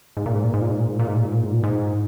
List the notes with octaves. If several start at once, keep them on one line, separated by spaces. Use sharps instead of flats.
G#2
A#2
G#2
A#2
G#2
A#2
G#2
A#2
G#2
A#2
G#2
A#2
G#2
A#2
G#2
A#2
G#2